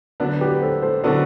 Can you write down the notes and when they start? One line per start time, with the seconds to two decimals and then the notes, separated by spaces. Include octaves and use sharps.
0.20 D3 F#3 B3 D4
0.41 G4 B4
0.62 A4 C5
0.82 A4 C5
1.04 D3 F#3 B3 D4 F#4 A4